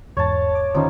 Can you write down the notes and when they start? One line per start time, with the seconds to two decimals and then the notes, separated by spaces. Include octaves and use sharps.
0.17 E2 G#2 C#5 A5
0.55 D6
0.75 D3 D#3 F3 G3 C#4 D#4